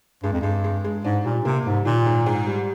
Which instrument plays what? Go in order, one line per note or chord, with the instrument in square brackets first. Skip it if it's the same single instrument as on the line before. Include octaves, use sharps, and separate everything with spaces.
[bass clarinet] G2 [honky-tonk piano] G#3
[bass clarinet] F2
[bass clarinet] G2 [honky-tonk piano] G#3
[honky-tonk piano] G#3
G#3
[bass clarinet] G#2 [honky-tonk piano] D4
[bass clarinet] A#2 [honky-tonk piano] G3
[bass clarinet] C3 [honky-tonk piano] A#3
[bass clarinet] G#2 [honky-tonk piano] G3
[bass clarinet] A#2 [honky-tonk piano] D#3
[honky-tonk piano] G#2
G#2
G3